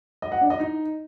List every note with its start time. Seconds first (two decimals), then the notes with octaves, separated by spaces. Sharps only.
0.22 D#5
0.32 F#5
0.41 D4
0.50 D#5
0.60 D#4